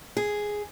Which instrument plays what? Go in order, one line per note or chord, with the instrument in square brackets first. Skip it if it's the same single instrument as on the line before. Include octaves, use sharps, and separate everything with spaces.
[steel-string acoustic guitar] G#4